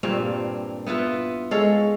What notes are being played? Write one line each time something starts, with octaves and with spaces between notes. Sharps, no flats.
G2 A#2 C4 F5
B3 E4 F4 B4
G#3 A4 C#5 F5